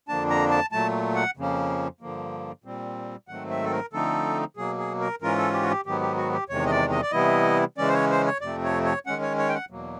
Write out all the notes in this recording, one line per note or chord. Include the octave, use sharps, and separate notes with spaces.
F2 D3 F3 A#3 D4 A5
A#5
A5
A#2 F#3 A3 A5
F#5
F2 C#3 F3 A#3 C#4
G2 D3 F3 A#3
A#2 G3 C4
G#2 D#3 F#3 A3 C4 F#5
E5
A4
A#4
D3 F3 A3 C4 D#4 A4
B2 F#3 A#3 G#4
G#4
A#4
G#2 E3 G#3 C#4 F4 A#4
A4
G4
F#4
G4
G#2 D#3 F#3 B3 G4
G4
F#4
G4
E2 C3 D#3 G#3 C#5
D#5
D5
D#5
D5
C3 E3 G3 B3 E4 D#5
C#3 E3 G#3 C#4 D5
C5
C#5
C5
C#5
F2 C3 F3 A3 C4 D5
C#5
C#5
D#3 G#3 C#4 F#5
C#5
C#5
G5
F#5
E2 B2 F#3 A#3